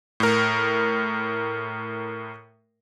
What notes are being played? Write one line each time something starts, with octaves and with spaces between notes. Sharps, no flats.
A2 A#4